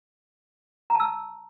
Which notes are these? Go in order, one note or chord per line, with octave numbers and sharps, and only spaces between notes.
A5 A#5 E6